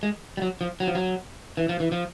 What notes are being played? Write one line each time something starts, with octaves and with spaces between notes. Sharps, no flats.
G#3
G3
F#3
F3
F#3
F3
F#3
E3
F3
E3
F3